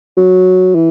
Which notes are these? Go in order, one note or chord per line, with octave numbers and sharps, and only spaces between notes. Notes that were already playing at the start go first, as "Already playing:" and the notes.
F#3
E3